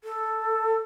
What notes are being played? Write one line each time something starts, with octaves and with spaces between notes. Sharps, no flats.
A4